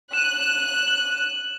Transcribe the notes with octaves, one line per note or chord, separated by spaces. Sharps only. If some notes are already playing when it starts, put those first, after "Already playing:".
F#6 D#7 E7
F#7